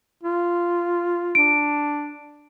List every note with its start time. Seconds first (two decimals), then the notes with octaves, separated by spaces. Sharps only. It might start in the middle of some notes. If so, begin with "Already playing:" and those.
0.23 F4
1.35 D4 D7